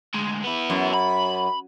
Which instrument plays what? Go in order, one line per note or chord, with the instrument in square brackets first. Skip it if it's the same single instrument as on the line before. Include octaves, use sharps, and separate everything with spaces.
[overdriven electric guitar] D2 G#3
B3 E4
[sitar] F#2
[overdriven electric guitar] B5